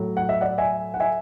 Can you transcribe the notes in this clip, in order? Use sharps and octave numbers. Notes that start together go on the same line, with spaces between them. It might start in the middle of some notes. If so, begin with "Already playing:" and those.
Already playing: A2 F#3
F#5
E5
D5 F#5
E5 G#5
F#5
E5 G#5